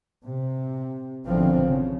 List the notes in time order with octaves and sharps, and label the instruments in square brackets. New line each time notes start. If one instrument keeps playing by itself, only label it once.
[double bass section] C3
G#1 B2 D3 E3 F3 C4
C#3